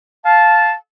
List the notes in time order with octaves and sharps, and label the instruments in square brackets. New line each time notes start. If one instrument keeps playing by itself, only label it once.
[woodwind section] F5 A5